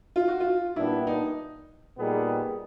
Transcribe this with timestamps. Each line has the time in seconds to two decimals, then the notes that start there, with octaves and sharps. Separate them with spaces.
0.16 F4
0.28 F#4
0.40 F4
0.76 A#2 G3 B3 D4 E4
1.07 D#4
1.98 A#2 G3 B3 D#4 G#4